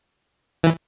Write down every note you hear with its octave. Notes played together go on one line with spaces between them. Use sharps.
E3